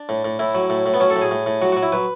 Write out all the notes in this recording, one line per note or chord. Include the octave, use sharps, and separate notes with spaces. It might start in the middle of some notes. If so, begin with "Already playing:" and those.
Already playing: D4
A2
A2
A2 E4
F#3
A2
A2
B3
F#3 C#4
A4
A2
G#4
A2
A2
F#3 F#4
F#3 F#4
E4
F#3 B4